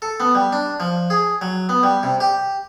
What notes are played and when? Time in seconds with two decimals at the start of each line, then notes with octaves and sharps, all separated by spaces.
0.02 A4
0.20 B3
0.35 G3
0.52 D4
0.80 F3
1.10 G#4
1.41 F#3
1.69 B3
1.83 G3
2.03 C3
2.20 G4